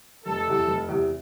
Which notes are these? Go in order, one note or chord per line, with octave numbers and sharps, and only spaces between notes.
F1 A4
E2 C3
F1
E2 C3